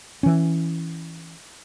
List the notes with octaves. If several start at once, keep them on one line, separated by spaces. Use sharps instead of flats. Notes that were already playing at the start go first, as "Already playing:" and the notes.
E3 C#4